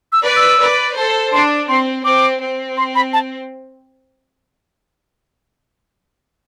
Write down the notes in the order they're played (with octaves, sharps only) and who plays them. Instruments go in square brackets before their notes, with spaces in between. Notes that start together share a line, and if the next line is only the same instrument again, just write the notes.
[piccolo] E6
[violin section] B4 D5
[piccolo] E6
[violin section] B4 D5
A4 C5
[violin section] D4 [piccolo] C6
[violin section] C4 [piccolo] C6
[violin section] C4 [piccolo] D6
[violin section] C4
[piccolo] C6
B5
A5